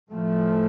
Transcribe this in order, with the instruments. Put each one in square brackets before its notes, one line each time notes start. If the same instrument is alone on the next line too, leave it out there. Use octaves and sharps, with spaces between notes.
[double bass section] A2 F3 A3